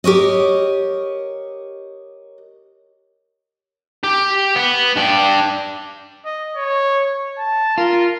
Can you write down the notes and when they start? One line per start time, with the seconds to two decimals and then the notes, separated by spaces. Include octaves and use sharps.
0.04 G4 A#4 C#5 D#5
4.04 G4
4.56 B3
4.96 D4 G5
6.25 D#5
6.57 C#5
7.39 A5
7.78 F4 A#4